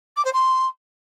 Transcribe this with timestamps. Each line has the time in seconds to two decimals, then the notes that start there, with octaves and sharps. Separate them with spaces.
0.16 D6
0.25 C5
0.33 C6